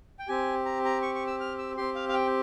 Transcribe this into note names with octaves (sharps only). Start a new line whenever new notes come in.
G5
C4 G4 G#5
A#5
A#5
C#6
C#6
E6
F6
E6
C4 G4 C6
F5
F5
G5